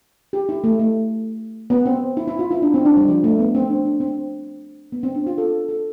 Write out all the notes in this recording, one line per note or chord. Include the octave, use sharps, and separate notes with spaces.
G4
E4
A3
A3
B3
C4
E4
E4
F4
E4
D4
C4
D4
G3
F3
A3
B3
C4
D4
D4
C4
B3
C4
D4
F4
A4
A4